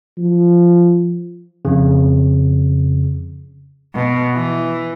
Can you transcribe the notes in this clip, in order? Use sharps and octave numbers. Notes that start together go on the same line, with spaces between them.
F3
F2 C#3
B2
E3